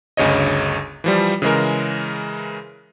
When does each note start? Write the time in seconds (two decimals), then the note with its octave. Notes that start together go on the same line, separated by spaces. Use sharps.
0.17 G1 D2 C#3 C#5 D#5
1.04 E3 F3 G3
1.42 C#3 E3 G#3 A#4